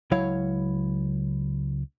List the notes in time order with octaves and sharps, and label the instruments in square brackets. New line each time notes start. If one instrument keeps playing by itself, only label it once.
[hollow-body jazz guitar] C#2 F#3 E4 C#5 F5